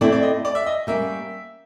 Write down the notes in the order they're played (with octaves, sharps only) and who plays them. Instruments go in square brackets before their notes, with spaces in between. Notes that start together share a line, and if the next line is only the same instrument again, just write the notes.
[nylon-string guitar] A3 C4 E4 [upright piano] D5
[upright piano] D5
D#5
D5
E5
D#5
[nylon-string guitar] G3 A#3 C#4 [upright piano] E5